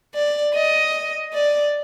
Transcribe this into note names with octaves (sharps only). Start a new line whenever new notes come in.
D5
D#5
D5